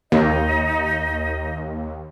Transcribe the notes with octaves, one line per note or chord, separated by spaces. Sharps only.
D#2 D#4 D#5